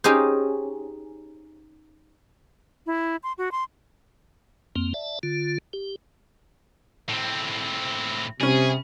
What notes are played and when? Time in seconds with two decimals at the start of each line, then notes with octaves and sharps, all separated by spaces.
0.04 C#4 D#4 G4 G#4 C5
2.86 E4
3.23 C6
3.38 F#4
3.52 C6
4.76 F2 A#3 C4
4.94 D5 E5 A5
5.23 D3 F4
5.73 G4
7.09 A2 C4
8.40 C3 G3 C#4 G#4